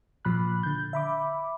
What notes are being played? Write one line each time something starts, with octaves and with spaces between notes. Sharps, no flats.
A#2 F3 B5 F#6
D3 G6
E5 B5 D6